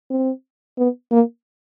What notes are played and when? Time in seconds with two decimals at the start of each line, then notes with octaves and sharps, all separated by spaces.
0.10 C4
0.78 B3
1.12 A#3